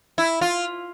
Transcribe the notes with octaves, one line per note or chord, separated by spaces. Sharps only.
E4
F4